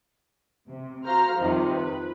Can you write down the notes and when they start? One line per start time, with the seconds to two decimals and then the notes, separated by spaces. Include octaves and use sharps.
0.65 C3
1.05 F#4 C5 F5 A#5 F6
1.36 F2 C3 D#3 F3 G3
1.72 B4